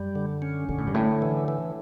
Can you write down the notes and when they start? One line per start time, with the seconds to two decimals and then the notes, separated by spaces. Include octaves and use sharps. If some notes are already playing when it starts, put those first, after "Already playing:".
Already playing: F#2 G3
0.15 D3
0.42 C#4
0.69 B2 D3
0.78 A2
0.87 G2
0.94 A2 D3
1.22 E3
1.48 E3